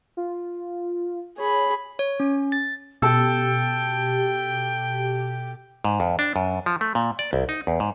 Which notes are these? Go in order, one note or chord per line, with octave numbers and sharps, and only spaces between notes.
F4
G#4 C#5 B5
C#5
C#4
A6
B2 G4 A4 G5
G#2
F2
D4
F#2
F3
A3
A#2
D5
C2
D#4
E2
G#2